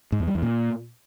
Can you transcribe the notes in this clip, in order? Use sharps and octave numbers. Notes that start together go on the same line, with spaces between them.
G#2
E2
G3
E2
A#2